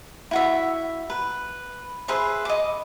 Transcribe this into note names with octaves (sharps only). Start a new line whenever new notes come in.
E4 F#4 E5
B4
G#4 B4 C5 E5
D#5 D6